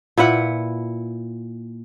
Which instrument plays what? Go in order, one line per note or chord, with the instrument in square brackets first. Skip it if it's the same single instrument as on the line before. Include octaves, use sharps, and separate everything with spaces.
[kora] A#2 E4 B4 F#5